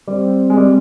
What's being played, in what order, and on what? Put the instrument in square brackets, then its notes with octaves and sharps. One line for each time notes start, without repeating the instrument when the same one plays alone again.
[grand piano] G3 [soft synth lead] C4
[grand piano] G#3
G3